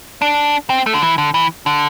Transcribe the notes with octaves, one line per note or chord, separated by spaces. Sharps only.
D4
C4
A3
D3
E3
D3
E3
D3